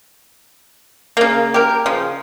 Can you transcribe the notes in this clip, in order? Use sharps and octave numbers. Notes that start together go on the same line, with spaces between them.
C#3 A#3
G4 A#4
C#3 F3